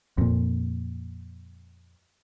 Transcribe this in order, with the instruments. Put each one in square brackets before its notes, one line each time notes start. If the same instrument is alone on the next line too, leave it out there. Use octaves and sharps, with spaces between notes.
[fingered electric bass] F2 A#2